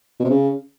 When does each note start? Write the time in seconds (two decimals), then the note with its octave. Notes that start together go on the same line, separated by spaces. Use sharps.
0.20 B2
0.25 C3
0.30 C#3